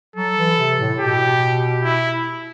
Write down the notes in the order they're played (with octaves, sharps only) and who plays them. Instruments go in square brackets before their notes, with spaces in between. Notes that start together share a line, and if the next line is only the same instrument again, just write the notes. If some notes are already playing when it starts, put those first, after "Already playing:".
[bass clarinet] F#3 [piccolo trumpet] A4
[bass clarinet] E3
C3
A2
[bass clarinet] B2 [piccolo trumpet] G4
[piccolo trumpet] E4